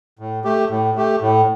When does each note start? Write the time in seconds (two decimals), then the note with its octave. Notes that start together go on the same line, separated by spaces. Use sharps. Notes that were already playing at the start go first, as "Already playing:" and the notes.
0.19 A2
0.44 A3 G4
0.70 A2
0.95 A3 G4
1.21 A2